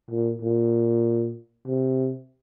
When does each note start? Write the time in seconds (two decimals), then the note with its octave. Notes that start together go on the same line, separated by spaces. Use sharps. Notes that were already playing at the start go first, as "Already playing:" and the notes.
0.11 A#2
0.42 A#2
1.67 C3